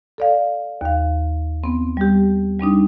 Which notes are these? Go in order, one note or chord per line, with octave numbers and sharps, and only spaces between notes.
A4 D5 F5
D#2 F5
B3 C4
G3 G4
G3 C4 D4 D#4